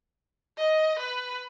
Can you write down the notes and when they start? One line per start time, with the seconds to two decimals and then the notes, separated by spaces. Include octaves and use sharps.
0.58 D#5
0.99 B4